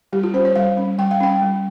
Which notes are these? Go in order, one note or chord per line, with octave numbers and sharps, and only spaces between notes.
G3 G4
F4
C#4 C5
C#5
G3 F5
C#4
G3 G5
F5
C#4 G5
G3